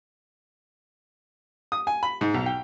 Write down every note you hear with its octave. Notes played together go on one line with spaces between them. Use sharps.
D#6
G#5
B5
G#2
B1
G5